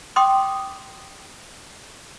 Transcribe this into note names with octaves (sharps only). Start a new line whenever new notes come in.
G5 C6 D6 D#6